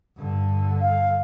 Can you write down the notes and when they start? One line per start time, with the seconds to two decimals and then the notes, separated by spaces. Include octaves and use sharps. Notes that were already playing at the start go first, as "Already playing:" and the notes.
0.17 G2 D3
0.81 F5